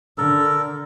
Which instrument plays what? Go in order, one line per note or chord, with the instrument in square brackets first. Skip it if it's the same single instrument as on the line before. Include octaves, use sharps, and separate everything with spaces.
[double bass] D3 [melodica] A4 A#4